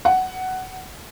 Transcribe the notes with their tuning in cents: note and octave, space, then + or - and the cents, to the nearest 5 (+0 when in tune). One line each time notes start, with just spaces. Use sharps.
F#5 +10